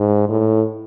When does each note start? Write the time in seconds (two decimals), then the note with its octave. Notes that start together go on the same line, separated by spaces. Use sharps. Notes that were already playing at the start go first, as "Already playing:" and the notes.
Already playing: G#2
0.29 A2